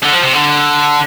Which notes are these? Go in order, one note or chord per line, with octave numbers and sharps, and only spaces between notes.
D3
F3
C3
D3